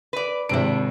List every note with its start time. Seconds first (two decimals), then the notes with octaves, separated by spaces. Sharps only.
0.13 B4 D5
0.49 G#1 C3 D4 E4 D7